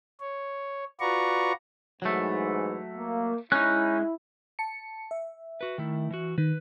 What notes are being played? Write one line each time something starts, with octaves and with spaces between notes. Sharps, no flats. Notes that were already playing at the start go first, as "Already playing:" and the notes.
C#5
F4 F#4 B4 D5 A#5 C#6
G#2 E3 F#3 A3
A#3
G#3 C#4 D#4 E4 F#6
A5 C#7
E5
F#4 B4
D#3 A3 E4
E3 F#4
D#3 B4